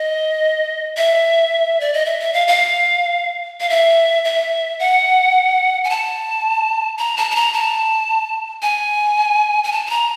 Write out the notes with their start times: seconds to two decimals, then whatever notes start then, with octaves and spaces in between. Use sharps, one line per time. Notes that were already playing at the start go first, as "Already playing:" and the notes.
Already playing: D#5
0.97 E5
1.80 D5
1.94 D#5
2.05 E5
2.20 E5
2.33 F5
2.48 F5
3.60 F5
3.70 E5
4.25 E5
4.80 F#5
5.84 G#5
5.90 A5
6.99 A#5
7.17 A5
7.31 A5
7.36 A#5
7.53 A5
8.62 G#5
9.64 G#5
9.72 A5
9.87 A5
9.90 A#5